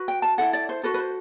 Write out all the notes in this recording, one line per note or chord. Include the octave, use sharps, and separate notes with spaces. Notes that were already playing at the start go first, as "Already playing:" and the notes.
Already playing: F#4 B4
G5
A5
E4 A4 F#5
D5
C5
F#4 A4 B4
B4
C5